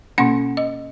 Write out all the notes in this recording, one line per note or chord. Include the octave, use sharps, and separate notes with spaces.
B2 A#3 C#4 F#5
D#5